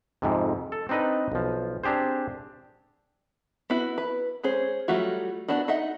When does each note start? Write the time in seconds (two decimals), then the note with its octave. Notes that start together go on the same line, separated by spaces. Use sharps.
0.22 F2 G#2 C3
0.72 A4
0.89 C4 D4 D#4 B4 D#5
1.32 B1 F3
1.84 C4 D4 G4 G#4 C5
3.70 B3 E4 F#4
3.98 B4
4.43 G#3 C#4 G#4 C5
4.88 F#3 G3 A3 F4 F#4
5.48 B3 D4 E4 F#4
5.68 D#4 D#5 E5 F#5